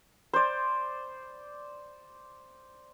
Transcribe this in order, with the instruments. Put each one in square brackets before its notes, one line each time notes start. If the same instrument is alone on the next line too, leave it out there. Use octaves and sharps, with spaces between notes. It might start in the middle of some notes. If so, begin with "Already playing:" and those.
[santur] C5 D5